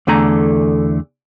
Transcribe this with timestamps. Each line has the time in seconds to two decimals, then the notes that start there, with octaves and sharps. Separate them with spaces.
0.07 E2 D3 A3 G#5 A#5